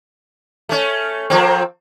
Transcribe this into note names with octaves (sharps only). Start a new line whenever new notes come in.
A3 C#4
F3 A#3 C4